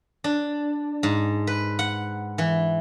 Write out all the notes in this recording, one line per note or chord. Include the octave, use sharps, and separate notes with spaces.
D4
G#2
B4
F#5
E3